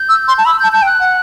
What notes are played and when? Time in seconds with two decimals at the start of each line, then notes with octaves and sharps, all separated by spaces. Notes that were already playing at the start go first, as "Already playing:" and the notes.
Already playing: G6
0.09 E6
0.28 C6
0.38 A5
0.45 B5 E6
0.60 A5 G6
0.72 A5 G6
0.82 G5
0.86 F#6
1.00 F#5